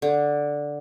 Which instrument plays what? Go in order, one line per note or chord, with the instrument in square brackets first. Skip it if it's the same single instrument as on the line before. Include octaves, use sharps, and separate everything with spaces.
[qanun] D3